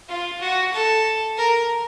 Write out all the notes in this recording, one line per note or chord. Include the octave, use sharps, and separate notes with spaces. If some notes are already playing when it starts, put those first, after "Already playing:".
F4
F#4
A4
A#4